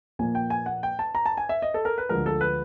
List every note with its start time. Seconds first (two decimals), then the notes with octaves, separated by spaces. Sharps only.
0.19 A#2 F3 A#3 G#5
0.35 G5
0.50 G#5
0.66 F#5
0.83 G5
0.99 A5
1.15 A#5
1.26 A5
1.37 G#5
1.49 E5
1.62 D#5
1.74 A4
1.85 A#4
1.98 B4
2.09 D2 D3 F3 G#3 A#4
2.26 A4
2.41 B4